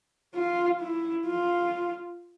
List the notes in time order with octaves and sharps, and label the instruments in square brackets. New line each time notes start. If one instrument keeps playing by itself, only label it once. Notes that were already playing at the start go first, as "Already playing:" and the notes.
[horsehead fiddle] F4
E4
F4